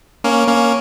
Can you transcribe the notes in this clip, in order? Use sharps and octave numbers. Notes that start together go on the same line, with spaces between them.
A#3 C#4
A#3 C#4